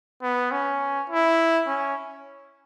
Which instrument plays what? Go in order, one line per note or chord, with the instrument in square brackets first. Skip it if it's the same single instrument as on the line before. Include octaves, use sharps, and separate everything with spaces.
[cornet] B3
C#4
E4
C#4